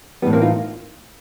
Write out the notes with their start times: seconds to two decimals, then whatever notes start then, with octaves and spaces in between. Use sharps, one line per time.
0.22 A2 E3 G3 B3
0.33 A#3 C4
0.41 D#4 F4